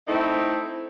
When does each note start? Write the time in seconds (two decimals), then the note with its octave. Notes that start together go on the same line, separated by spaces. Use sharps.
0.08 A3 C4 D#4 E4